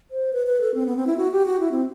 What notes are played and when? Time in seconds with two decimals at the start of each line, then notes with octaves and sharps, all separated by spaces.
0.11 C5
0.33 B4
0.46 B4
0.61 A4
0.74 C4
0.86 B3
0.97 C4
1.07 E4
1.17 F#4
1.32 G4
1.46 F#4
1.60 E4
1.71 C4